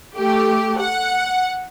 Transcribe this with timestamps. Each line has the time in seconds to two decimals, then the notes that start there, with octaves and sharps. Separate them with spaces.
0.17 A3 G4
0.79 F#5